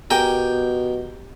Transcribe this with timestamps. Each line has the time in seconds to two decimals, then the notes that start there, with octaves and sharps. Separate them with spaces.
0.11 B2 G4 A#4 G5 G#5